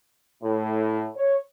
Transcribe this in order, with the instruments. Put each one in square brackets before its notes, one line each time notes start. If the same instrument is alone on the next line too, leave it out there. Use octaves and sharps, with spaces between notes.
[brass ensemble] A2
C#5